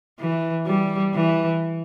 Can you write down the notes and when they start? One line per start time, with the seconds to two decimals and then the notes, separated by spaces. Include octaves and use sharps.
0.20 E3
0.66 G3
1.15 E3